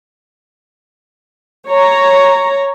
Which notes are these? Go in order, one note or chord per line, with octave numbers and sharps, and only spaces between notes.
C#5 A#5